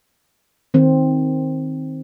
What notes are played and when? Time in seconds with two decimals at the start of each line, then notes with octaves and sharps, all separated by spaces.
0.74 D#3 C4